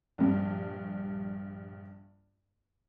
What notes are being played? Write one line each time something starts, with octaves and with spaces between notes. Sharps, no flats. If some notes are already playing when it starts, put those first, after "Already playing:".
A#1 G2